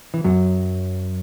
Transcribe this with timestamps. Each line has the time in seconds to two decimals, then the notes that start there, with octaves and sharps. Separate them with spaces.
0.14 E3
0.24 F#2 F#3